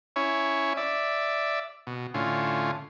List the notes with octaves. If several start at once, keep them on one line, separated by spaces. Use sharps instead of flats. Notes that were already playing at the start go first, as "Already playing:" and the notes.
C#4 E4 C#5
D5 E5
B2
A2 D3 C#4 F4